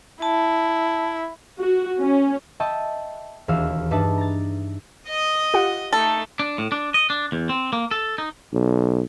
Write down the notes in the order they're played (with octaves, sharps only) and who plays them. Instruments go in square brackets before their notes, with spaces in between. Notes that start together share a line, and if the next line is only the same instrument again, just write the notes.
[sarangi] E4 [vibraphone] A5
[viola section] F#4
C#4
[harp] D#5 E5 G5 A5 B5 C#6
E1 D#2 E3 F#4 F5 E6
G2 D4 D#4 B4 E5 A5
A#5 A6
[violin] D#5 D#6
[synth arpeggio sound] F4 G4 F#5
[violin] A3 D#4 [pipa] A4
[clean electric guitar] D4
A2
D4
D#5
D4
E2
C4
A#3
A4
D#4
[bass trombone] B1